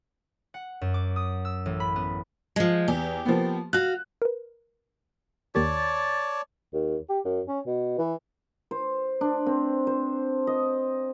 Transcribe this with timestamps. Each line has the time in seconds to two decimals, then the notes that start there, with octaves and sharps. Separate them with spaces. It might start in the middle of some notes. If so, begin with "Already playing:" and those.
0.54 F#5
0.81 F#2
0.94 D6
1.16 D#6
1.45 E6
1.66 A1
1.80 B5
1.96 B3
2.56 F3 G#3
2.88 E2 G4
3.25 F3 A#3 B3
3.73 F#4 F5 F#6
4.22 A#4 B4
5.55 D#2 D#3 G4 C#5 D5 A5
6.73 D#2
7.09 G4
7.25 F#2
7.48 C#4
7.66 B2
7.98 E3
8.71 C5
9.21 D4
9.46 C4
9.87 C5
10.47 D#5